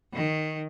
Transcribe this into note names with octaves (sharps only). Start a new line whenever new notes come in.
D#3